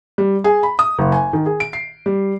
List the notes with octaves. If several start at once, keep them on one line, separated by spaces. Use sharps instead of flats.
G3
G#4
B5
D#6
F#1
G#5
D#3
G#4
D7
C7
G3